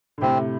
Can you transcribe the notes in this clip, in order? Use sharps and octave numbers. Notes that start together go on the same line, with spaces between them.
D3
A2 C3 C4